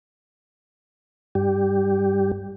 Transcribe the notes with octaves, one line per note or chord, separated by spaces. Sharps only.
G2 G3 G4